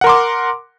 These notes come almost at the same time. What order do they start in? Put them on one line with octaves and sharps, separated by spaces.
F#5 A#4 C6 D6